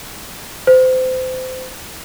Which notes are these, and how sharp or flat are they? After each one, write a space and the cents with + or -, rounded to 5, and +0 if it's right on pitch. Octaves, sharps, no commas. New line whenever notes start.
C5 -30